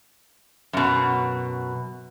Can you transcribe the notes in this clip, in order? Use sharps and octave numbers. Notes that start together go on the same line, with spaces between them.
F#2 B2